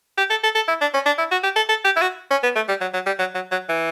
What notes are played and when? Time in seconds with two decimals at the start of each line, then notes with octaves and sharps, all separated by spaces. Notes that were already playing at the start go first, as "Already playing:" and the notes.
0.18 G4
0.30 A4
0.44 A4
0.55 A4
0.68 E4
0.81 D4
0.94 C#4
1.06 D4
1.19 E4
1.32 F#4
1.43 G4
1.56 A4
1.69 A4
1.85 G4
1.97 E4
2.02 F#4
2.31 C#4
2.43 B3
2.56 A3
2.69 G3
2.81 F#3
2.94 F#3
3.06 G3
3.19 F#3
3.35 F#3
3.52 F#3
3.69 E3